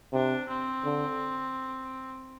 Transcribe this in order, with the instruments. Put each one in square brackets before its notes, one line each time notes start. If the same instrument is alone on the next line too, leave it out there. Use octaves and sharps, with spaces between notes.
[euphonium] C3 [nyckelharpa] D4
[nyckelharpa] C4
[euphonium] D3